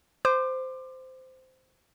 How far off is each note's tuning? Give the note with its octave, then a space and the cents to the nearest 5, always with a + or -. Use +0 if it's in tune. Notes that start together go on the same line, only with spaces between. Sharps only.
C5 -15 D6 +25